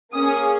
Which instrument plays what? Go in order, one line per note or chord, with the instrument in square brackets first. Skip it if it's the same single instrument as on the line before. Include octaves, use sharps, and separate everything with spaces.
[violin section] A#3 C#4 G#4 D#6